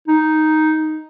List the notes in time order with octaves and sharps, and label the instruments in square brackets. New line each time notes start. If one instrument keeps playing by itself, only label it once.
[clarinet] D#4